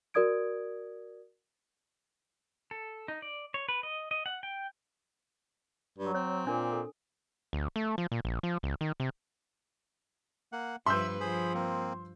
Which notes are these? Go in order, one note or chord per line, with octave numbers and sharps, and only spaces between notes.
F#4 A#4 D5 D#6 G#6 D7
A4
D#4
D5
C#5
B4
D#5
D#5
F#5
G5
G2 F#3
C4 C#5
A#2 D4 A#4
A4
D2
A3
F3
A#2
A#1
F3
C#2
D#3
C3
A#3 F#5
G2 F3 B4 E5 B5 C6 E6 G6
F3 G#4 C5 B5
A#3 C4